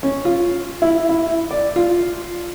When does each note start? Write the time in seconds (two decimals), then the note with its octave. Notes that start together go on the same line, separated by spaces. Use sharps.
0.03 C#4
0.25 F4
0.82 E4
1.09 E4
1.51 D5
1.76 F4